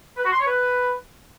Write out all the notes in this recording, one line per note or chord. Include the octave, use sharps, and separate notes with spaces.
B4
F#4
C6
C#5
B4